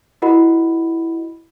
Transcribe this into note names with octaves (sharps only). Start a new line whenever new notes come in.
E4 F#4 A#4 D#5 F#5 B5